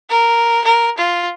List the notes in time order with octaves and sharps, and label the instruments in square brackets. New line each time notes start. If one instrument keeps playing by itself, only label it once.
[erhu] A#4
A#4
F4